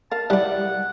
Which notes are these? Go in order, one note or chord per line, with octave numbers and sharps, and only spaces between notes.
A#4 F5 A5
G3 E4 D5 F#5